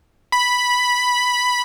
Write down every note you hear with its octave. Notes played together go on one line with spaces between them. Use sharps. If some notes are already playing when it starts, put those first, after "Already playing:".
B5